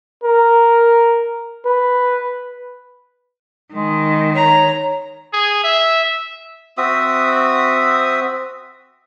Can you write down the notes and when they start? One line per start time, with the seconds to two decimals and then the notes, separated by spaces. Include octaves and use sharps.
0.24 A#4
1.66 B4
3.74 D#3 G#3
4.35 C#5 A#5
5.33 G#4
5.64 E5
6.77 C4 F#4 E5 D#6